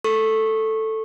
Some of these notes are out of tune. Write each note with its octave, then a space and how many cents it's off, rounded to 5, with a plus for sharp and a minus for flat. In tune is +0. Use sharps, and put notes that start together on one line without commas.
A4 +5 C#6 -20